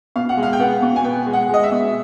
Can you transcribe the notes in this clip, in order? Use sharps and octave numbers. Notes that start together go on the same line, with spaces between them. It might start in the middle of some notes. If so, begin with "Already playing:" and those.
B2 F5
F#5
G#3
F5
G5
B3 F#5
B2
G#5
B3 G5
G#3
F#5
G#3 D#5
E5
B2